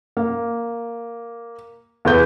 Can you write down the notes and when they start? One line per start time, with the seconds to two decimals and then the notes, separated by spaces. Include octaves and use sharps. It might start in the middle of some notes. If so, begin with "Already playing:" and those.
0.17 A#3
2.05 E2 G#4 B4 G6